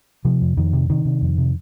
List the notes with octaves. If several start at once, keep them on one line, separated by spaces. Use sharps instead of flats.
C3 F3
F2
F2 D#3
C3
C3 D#3
C3
F2
C3